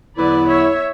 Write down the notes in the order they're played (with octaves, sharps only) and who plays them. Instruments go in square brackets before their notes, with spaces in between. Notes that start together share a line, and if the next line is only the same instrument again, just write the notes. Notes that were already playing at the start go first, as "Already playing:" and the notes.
[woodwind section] E2 D3 F#3 B3 E4 [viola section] B4 D5
[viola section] C#5 E5